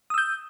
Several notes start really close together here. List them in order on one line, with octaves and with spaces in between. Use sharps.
D#6 E6 G6